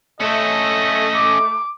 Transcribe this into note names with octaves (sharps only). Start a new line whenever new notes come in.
A3 C#4 A4 D#5
D6